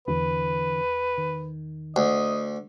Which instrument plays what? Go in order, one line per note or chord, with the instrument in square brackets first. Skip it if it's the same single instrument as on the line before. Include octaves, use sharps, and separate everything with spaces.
[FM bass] E2 [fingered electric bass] D3 E3 [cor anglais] B4
[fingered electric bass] D#3
[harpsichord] D2 [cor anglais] D#5